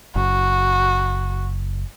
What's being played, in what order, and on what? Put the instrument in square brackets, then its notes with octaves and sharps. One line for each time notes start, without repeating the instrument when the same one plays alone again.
[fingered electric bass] F#1 [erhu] F#4